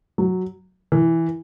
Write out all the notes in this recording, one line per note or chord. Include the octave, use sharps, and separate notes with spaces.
F#3
E3